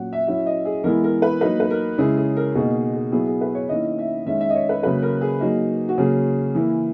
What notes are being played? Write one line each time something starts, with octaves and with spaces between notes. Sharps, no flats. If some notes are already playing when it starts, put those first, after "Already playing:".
Already playing: A#2 F#3 C#4 F#5
E5
F#3 C#4 E4 E5
D#5
G#4
E3 G#3 B3 E4 A#4
A#4
B4
F#3 A#3 D#4 B4
B4
A#4
C#3 G#3 C#4 E4 G#4
G#4
A#4
B2 A#3 D#4 G#4
G#4
F#3 B3 E4 G#4
G#4
B4
C#5
D#3 A#3 C#4 E4 D#5
E5
D#3 G#3 C#4 E5
E5
D#5
C#5
B4
C#3 F#3 A#3 B4
A#4
G#4
F#3 A#3 D#4
F#4
C#3 F#3 A#3 G#4
E3 A#3 E4